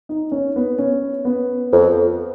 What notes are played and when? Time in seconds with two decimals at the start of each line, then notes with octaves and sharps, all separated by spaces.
0.09 D#4
0.32 C#4
0.56 B3
0.78 C#4
1.25 B3
1.72 F2